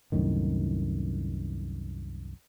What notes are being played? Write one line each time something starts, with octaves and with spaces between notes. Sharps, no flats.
C2 F#2 A2 D#3